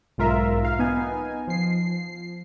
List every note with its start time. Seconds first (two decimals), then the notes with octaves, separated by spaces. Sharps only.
0.18 B1 G#2 F4 A#4 E5
0.65 F5
0.79 B3 D#4 G#5
1.47 F3 C7